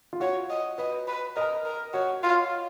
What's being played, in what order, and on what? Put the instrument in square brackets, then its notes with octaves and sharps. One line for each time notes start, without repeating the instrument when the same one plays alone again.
[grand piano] F4
[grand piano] F#4 [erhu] C#5
[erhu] D#5
[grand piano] B4 [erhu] D#5
[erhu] B4
[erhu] A#4 [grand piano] D#5
[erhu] A#4
[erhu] F#4 [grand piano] C#5
[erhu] F4